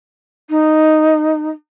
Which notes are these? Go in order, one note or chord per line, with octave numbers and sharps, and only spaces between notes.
D#4